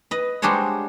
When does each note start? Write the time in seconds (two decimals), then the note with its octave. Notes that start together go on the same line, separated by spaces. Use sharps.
0.11 B4 D#5
0.42 G3 G#3 D4 F#4 C5 C#5